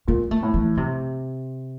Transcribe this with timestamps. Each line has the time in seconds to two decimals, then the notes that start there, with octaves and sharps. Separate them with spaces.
0.08 A#2 A#3
0.31 A3
0.43 A2
0.54 E3
0.77 C3